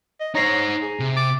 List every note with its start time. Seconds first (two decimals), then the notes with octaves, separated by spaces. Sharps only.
0.20 D#5
0.35 D#4 C5 C#5 A#5 A#6 C7
0.82 G#4
0.99 C3
1.17 D6 A6